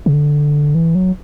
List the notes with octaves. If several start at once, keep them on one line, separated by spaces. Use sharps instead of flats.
C#3
D3
E3
F#3